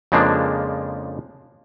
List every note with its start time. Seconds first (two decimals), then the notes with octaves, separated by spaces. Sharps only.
0.12 F2 C#3 F3 G#3 A#3 D4